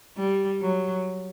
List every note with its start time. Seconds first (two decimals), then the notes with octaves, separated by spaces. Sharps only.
0.17 G3
0.62 F#3